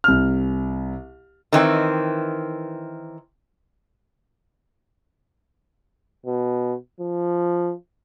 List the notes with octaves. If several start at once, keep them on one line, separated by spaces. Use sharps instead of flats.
C2 F6
D#3 E3 C4
B2
F3